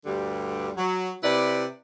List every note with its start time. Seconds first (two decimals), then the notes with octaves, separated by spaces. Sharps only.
0.05 D2 G2 D3 G3 G4
0.77 F#3
1.23 C3 E4 B4 D5